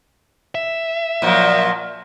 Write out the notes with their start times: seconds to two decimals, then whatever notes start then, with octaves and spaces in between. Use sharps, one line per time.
0.55 E5
1.22 A#2 F3 F#3